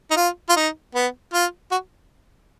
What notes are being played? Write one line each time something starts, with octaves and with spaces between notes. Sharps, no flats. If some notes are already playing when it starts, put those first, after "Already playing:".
D#4
F4
F4
D#4
B3
F4
F#4